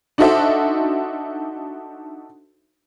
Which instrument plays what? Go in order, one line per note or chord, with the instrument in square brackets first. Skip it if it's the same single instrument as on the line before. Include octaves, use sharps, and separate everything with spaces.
[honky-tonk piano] D4 D#4 F#4 A4 C5 E5